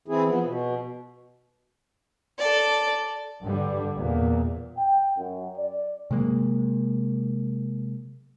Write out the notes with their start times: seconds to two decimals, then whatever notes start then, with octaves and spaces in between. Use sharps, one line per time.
0.08 E3 C4 E4 G#4
0.26 F3 B3
0.43 B2
2.38 A4 D5
3.43 G2 D3 G3
3.96 E2 A#2
4.78 G5
5.17 F#2
5.57 D5
6.11 C3 F#3 G#3 A#3